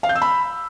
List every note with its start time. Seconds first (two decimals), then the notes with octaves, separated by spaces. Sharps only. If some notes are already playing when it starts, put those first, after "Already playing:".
0.03 F5
0.09 G6
0.15 E6
0.22 B5